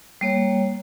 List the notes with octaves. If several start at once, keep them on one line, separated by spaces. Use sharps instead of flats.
G3 A#3 C#5